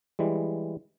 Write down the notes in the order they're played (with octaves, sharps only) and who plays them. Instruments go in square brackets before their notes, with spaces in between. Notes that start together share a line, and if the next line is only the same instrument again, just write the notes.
[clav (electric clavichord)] E3 G3 G#3